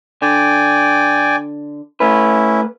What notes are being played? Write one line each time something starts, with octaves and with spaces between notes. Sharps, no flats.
D3 D5 G5 G#5
A3 C#4 E4 B4